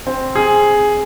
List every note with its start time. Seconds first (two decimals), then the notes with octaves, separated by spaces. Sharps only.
0.07 C4
0.35 G#4